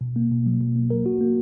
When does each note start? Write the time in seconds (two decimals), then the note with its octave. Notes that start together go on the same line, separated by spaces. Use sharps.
0.01 B2
0.16 A#3
0.31 B2
0.46 F#3
0.61 B2
0.76 A#3
0.90 A#4
1.06 F#4
1.21 A#3